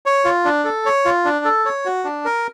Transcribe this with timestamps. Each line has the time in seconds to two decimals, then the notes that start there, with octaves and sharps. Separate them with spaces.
0.06 C#5
0.25 F4
0.45 D4
0.65 A4
0.86 C#5
1.05 F4
1.25 D4
1.45 A4
1.65 C#5
1.85 F#4
2.04 D4
2.25 A#4